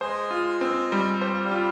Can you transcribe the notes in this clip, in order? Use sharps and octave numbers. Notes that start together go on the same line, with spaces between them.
G#3 G#4 C5
F4
C4
G3
G4 C5
F4
G3 G4
F4